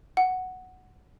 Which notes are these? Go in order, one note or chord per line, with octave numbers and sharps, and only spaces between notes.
F#5